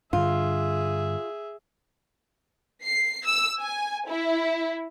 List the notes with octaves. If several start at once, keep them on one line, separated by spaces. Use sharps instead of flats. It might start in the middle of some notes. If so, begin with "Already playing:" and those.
G2 D3 F4 G#4 E5
C7
E6
G#5
E4